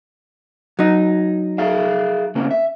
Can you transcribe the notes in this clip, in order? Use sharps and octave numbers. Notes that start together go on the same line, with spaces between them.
F#3 D#4
G#4 E5 F5
C#3 A#3 C4
E5